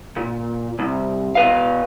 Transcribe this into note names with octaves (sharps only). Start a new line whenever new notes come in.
A#2
C2
B2 B4 F5